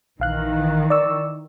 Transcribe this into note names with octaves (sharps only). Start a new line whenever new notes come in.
A#1 D#3 E3 F5 F#6
D5 C#6 E6